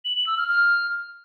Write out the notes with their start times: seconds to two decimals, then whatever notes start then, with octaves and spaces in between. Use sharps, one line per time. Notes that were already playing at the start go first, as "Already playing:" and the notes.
0.05 F#7
0.16 F#7
0.27 E6
0.38 F6
0.49 F6